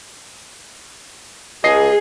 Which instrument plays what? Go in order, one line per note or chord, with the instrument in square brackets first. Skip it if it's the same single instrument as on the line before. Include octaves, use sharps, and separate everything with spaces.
[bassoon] C#2 [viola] G#4 [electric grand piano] D#5 C7